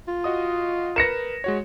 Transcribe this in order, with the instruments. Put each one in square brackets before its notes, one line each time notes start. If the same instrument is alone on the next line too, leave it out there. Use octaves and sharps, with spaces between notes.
[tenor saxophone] F4
[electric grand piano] F#4 D#5 D#6
[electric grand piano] A#4 B4 [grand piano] A#6 C#7 E7
[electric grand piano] G#3 F#4 C#5